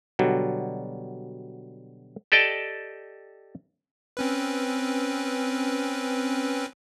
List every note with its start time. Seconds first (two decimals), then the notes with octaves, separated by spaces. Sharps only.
0.19 B2 D3 F#3 G3
2.32 G4 A4 D5 D#5 G5 A5
4.17 C4 C#4 B4